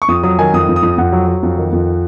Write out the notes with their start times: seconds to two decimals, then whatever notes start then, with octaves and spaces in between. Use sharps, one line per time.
0.02 C#6
0.08 F2 D#6
0.23 F#3 D#6
0.38 D#3 G#5
0.53 F2 D#6
0.69 F2
0.76 D#6
0.83 F2
0.98 F2 F#5
1.13 F#3
1.28 F#3
1.43 F2
1.58 D#3
1.73 F2